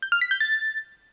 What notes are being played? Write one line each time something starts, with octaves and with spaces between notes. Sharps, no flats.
G6
F6
B6
G6
A6